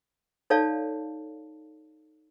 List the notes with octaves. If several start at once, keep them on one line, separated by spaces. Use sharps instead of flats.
D#4 A4 C#5 D5 F5 A5